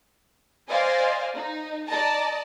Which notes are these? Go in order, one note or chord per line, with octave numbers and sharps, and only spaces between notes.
C5 D5 D#5 F5 G#5
D#4
D5 D#5 A5 A#5